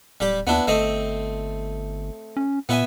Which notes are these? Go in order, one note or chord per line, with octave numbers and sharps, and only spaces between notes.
D1 G3 G4
D#2 B3 D4 E4
G1 A3 C4 D#5
C#4
A#2 B3 E5 G#5